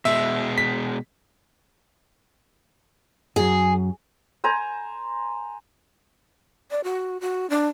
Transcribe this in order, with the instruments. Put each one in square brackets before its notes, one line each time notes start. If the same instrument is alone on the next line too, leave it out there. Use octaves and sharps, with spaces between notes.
[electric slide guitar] B2 G#3 [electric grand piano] E5
[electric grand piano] B6
[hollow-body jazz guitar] F#2 F#3 [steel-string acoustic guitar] G#4
[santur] C5 G#5 A#5
[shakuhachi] D5
F#4
F#4
D4